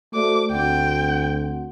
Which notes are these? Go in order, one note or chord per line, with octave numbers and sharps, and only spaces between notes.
A3 F#4 C5 D5 D6
D2 C4 F#5 G5